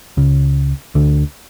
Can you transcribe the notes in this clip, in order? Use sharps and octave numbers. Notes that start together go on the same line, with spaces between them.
C#2 C#3
D2 D3